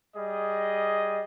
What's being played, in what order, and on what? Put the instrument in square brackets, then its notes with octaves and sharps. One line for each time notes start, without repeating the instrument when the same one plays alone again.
[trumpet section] G3 G#4 D#5